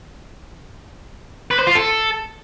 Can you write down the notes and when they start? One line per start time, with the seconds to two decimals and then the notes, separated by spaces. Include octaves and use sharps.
1.51 B4
1.59 C5
1.67 F4
1.75 A4